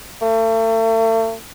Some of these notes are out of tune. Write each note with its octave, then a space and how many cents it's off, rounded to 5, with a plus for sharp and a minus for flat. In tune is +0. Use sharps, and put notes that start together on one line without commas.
A3 +40